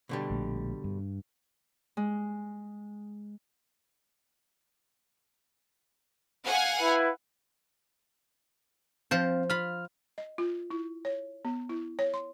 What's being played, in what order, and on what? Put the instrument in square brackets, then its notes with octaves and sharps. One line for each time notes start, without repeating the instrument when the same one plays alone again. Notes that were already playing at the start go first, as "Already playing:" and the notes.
[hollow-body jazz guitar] B2 D3 G3
[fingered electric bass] A#1 A3
G2
[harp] G#3
[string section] F5 F#5 G#5
[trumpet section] E4 B4
[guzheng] F3 C5 [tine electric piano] C4 F5
[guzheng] F4 B5 [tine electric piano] F6
[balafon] D#5
F4
E4
C#5
B3
E4
C#5
C6